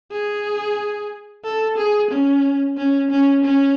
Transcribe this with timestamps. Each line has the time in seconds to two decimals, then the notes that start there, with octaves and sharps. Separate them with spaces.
0.12 G#4
1.44 A4
1.77 G#4
2.11 C#4
2.77 C#4
3.11 C#4
3.44 C#4